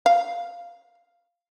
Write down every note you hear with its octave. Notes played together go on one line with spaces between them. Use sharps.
F5